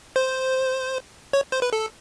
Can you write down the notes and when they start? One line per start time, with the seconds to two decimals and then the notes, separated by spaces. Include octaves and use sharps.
0.16 C5
1.33 C#5
1.52 C5
1.62 B4
1.73 A4